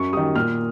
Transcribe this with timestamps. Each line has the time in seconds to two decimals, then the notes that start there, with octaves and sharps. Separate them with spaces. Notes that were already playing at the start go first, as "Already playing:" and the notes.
Already playing: F#2 C#6
0.13 D#3 G3 D#6
0.35 A#2 F6